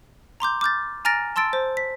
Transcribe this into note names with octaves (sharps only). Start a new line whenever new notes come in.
A#5 C6 D6 G6
D6 F6 G6 A6
G#5 A#5 F6 A6 A#6 D7
A5 C6 E6 A6 D7
C5
B6